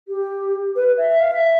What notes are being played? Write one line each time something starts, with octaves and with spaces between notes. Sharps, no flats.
G4
B4
E5
E5
F5
E5